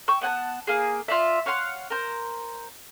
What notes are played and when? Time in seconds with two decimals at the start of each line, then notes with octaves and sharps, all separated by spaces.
0.08 G5 C#6 E6
0.21 B3 F#5 G#5 A5
0.67 A#3 G#4
1.08 F4 D5 E5
1.46 C#5 F5 F#5 C6
1.90 A#4 C5